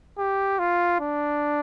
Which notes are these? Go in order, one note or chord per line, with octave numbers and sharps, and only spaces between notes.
G4
F4
D4